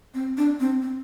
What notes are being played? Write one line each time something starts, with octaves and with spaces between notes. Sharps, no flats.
C4
D4
C4
C4